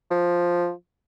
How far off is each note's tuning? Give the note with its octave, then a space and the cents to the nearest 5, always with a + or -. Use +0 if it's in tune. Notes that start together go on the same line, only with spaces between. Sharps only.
F3 +5